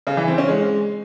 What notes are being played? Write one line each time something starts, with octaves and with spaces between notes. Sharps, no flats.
C#3
E3
C4
C#4
G#3